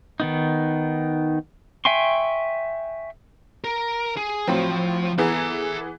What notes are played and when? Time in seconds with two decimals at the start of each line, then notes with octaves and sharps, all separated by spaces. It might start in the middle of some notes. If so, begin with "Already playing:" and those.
0.20 D#3 B3 D#4
1.85 E5 G5 G#5 C6 C#6
3.64 A#4
4.17 G#4
4.48 A2 F3 F#3 C4
5.18 E3 B3 G#4 A4 A#5